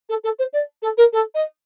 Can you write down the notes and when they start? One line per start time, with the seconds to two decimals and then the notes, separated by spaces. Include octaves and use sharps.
0.09 A4
0.24 A4
0.39 C5
0.53 D5
0.82 A4
0.98 A#4
1.13 A4
1.35 D#5